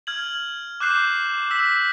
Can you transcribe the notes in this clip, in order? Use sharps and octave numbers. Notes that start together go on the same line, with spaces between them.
F6 G#6 F#7
D6 F#6 G6 C7 E7
E6 B6